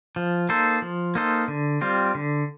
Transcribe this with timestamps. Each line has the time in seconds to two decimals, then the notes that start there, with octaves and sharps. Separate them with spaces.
0.16 F3
0.49 A#3 D#4 A4 C5
0.82 F3
1.15 A#3 D#4 A4 C5
1.48 D3
1.81 G3 C4 F4
2.15 D3